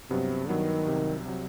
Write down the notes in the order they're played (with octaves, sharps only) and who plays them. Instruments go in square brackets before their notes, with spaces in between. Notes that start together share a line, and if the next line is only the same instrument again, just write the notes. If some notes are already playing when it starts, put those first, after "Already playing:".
[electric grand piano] G2 F#3 B3 [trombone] C3
[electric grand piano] G2 F#3 B3 [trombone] D#3
[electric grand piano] C2 C3 F#3
C3 F#3